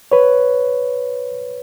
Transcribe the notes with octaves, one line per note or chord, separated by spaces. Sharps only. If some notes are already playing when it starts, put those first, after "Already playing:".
B4 C#5